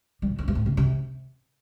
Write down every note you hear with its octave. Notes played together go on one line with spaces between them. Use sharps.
G3
A2
F2
G2
A2
C3
C3